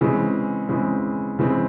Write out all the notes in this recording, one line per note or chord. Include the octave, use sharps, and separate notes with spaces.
C#3 E3 G#3 C4
C#3 E3 G#3 C4
C#3 E3 G#3 C4